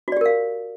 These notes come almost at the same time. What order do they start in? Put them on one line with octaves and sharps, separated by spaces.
F#4 D5 G4 A#4 F5